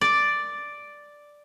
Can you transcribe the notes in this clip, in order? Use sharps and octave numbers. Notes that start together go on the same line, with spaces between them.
D5